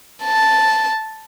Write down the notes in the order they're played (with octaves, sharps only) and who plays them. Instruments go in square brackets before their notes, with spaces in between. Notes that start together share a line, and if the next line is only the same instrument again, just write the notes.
[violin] A5